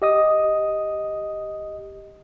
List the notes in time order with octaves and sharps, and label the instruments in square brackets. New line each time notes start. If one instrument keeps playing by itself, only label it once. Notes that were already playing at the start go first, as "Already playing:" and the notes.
[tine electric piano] G4 D#5 D#6